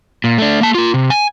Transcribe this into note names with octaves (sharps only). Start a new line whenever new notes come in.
A#2
A3 D4
A#3 A5
F4 A#4
C3
G#5